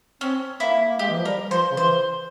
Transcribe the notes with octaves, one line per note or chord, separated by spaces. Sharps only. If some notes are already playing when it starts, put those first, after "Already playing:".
C4 C#4
A#3 E4
A#3
G#3 G4
E3
F3
G3 A#4
F3 C5
C#3
E3 C5